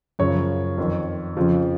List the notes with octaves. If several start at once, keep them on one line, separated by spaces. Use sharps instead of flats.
F#2 C#3 F3 C#5
F2 D#3
F2 C#3 F3